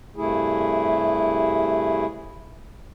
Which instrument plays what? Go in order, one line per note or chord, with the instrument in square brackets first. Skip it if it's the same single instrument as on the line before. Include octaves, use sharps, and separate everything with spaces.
[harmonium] G2 C3 A3 E4 G#4